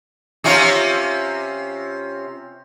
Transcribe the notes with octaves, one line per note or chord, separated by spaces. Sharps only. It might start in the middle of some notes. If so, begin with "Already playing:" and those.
C3 C#4 F4